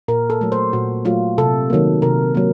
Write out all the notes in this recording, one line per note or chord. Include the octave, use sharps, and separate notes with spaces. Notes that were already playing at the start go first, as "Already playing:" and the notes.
A#2 A#4
A4
F#3 A3
C5
A#2 F#4
F#3 A3 F4
C3 A4
D#3 F#3 A#3
C3 A#4
F#3 A#3